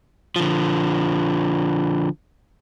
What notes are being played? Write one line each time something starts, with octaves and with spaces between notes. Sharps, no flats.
D3 F3